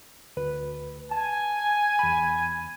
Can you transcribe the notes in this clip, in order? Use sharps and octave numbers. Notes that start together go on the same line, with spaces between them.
D2 B4
G#5 A5
E2 B5